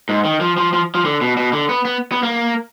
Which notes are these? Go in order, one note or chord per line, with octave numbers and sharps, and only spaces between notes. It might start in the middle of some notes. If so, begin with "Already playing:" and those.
G#2
D#3
F3
F3
F3
F3
D3
B2
B2
D3
B3
B3
B3
A#3